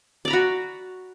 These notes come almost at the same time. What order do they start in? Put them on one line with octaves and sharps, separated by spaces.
D5 A#5 B5 F#4